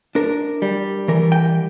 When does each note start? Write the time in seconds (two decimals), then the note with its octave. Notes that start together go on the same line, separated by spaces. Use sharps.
0.15 D4 A#4
0.62 G3
1.08 E3 A#4
1.32 G5